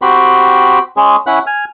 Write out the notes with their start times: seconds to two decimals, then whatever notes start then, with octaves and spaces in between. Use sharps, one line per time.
0.02 C4 F#4 G4 B5 C6
0.97 G#3 C#4 G#4
1.27 C#4 E4 F#5 B5 F#6
1.47 G#5 F6